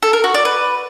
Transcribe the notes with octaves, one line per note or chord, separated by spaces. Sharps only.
A4
A#4
F#4
D5
B4